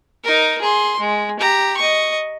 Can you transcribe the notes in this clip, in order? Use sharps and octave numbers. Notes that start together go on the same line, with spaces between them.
D#4 A#4
G#4 C6
G#3
G4 A#5
D#5 C#6